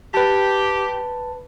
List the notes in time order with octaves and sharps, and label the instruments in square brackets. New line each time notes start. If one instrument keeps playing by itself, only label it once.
[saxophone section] G4 [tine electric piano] B4 A5